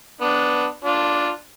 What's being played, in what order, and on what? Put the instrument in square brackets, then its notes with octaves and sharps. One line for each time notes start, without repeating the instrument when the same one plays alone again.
[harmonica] B3 D4
D4 F4